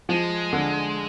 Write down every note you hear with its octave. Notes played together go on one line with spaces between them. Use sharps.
F3 G#3
D3